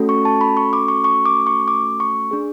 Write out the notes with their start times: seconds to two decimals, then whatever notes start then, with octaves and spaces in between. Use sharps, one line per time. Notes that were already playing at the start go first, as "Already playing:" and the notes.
Already playing: A3 C#4 F#4 A4
0.09 C#6
0.25 A5
0.41 B5
0.57 C#6
0.73 D6
0.88 C#6
1.04 C#6
1.25 D6
1.47 C#6
1.68 D6
2.00 C#6
2.31 D4 G#4